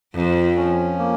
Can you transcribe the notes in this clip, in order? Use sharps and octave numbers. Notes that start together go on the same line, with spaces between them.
F2 F3
C#4
A#3